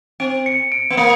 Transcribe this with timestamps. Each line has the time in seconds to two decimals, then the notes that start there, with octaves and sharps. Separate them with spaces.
0.20 C4 D7
0.46 C#7
0.72 D7
0.90 B3
0.97 A#3 C#7